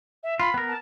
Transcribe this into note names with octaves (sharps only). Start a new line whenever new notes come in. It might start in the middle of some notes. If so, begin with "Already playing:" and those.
E5
F4 B5
B3 A#4
A5